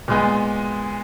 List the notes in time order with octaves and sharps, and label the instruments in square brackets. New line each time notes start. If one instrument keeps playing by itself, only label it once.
[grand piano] A#2 G#3 B3